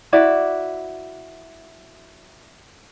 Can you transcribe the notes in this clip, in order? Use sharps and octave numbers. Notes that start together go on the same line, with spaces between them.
E4 F#4 D5